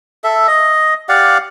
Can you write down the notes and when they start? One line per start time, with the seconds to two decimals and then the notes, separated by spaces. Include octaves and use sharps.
0.24 A4 E5
0.47 D#5
1.09 G4 D5 F5 F#5